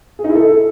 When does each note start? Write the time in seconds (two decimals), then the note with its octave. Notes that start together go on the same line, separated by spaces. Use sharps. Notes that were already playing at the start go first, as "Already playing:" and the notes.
0.19 G#4
0.24 D#4
0.30 E4
0.35 A4